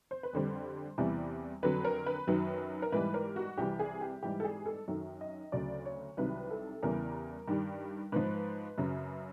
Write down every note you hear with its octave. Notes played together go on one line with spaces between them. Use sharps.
C5
B4
F2 D3 G3 C5
E2 C3 E3 G3
F2 D3 F#3 B4
A#4
B4
F#2 D#3 F#3 B4
A#4
G#2 E3 G3 B4
A#4
F#4
C2 C3 E3 G3 G4
G#4
G4
G#2 E3 G3 G4
A4
G#4
A4
F#2 D#3 F#3
D#5
D2 C#3 F#3 D5
C#5
C2 C3 D#3 F#3 B4
A4
E2 C#3 E3 G3 A#4
G2 D#3 G3
G#2 F3 B4
F#2 C#3 F#3